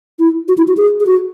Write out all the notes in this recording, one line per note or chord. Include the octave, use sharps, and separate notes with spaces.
E4
F#4
E4
F#4
G#4
G#4
F#4